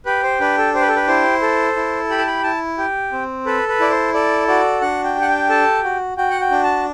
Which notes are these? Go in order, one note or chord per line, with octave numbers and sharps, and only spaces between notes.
G4 B4
C5
D4 B4
A4
G4 C5
B4
A4
B4
E4 C5
A4
E4
G4 B5
A5
B5
E4 A5
G4
C4
A4 B4
B4
E4 D5
C5
A4 D5
F#4 D5
D4 F#5
G5
G4
F#5
G5
A4 A5
F#4
F#4 G5
F#5
G5
D4
A5